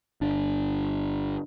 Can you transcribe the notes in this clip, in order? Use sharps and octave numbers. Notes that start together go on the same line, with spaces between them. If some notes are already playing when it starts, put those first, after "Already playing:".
G1 D4